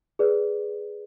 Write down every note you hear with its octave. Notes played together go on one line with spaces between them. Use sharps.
G#4 B4 D5